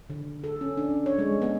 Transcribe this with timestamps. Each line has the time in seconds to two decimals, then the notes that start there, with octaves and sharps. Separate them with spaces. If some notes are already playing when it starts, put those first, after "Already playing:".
0.10 D3
0.44 A4
0.61 C#4
0.77 D4
1.06 C#5
1.18 G#3
1.42 B3